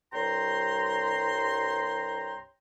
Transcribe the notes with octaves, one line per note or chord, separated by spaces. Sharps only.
C2 G2 C#5 G5 A#5 C6